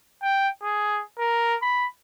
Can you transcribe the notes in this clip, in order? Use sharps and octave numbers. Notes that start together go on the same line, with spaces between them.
G5
G#4
A#4
B5